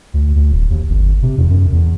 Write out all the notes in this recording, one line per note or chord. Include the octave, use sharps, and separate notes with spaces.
D2
D2
D1
D#2
G1
C3
E2
F#2
E2